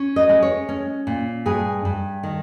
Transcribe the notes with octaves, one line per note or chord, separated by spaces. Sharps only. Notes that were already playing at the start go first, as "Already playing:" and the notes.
Already playing: C#4
D#5
G#3
C#5
C#4
A#2
G2 G#4
G2
D#3